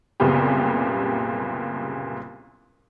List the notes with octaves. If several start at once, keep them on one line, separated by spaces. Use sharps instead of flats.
F#1 C2 A#2 C#3 B3 G4